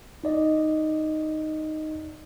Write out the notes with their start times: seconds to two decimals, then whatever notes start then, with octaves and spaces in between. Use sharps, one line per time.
0.24 D#4 D5 D#5